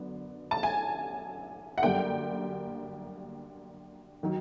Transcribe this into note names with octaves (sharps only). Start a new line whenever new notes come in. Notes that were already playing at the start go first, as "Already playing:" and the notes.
Already playing: F#2 D3 B3
A5
G#5
F#5
F#2 D3 G3 A#3 D4 G5
D#3 F#3